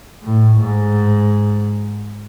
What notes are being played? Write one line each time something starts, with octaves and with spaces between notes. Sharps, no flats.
A2
G#2